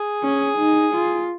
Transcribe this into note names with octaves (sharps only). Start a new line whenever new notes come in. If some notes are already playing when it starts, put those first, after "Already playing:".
Already playing: G#4
C#4
D#4
F4